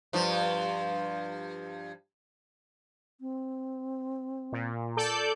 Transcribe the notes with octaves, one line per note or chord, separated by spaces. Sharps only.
G2 F3
C4
A#2
A4 D5 G6